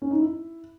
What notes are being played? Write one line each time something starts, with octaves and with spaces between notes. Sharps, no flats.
C#4
D#4
E4